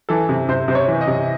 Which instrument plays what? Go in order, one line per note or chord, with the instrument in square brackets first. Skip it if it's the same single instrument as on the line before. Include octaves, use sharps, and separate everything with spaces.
[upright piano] E3 A4
C3
C3 C5
C3 C5
C#5
E3
D#5
C3